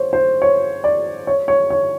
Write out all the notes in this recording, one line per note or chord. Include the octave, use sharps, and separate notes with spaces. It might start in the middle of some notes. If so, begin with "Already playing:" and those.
Already playing: C5 C#5
C5
C#5
D5
C#5
C#5
C#5